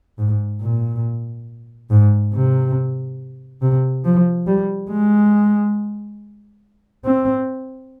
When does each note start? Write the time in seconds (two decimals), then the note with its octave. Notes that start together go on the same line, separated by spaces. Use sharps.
0.18 G#2
0.62 A#2
1.90 G#2
2.33 C3
3.62 C3
4.05 F3
4.47 G3
4.90 G#3
7.05 C4